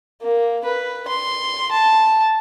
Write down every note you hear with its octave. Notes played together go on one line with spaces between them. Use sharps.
A#3
B4
C6
A5